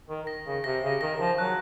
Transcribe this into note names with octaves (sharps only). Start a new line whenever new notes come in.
D#3
A#6
C#3
C3 A#6
C#3
D#3 A#6
F3
F#3 F#6